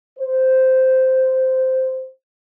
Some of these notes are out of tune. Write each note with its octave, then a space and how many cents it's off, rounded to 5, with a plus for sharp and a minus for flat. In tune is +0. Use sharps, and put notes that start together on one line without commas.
C5 -5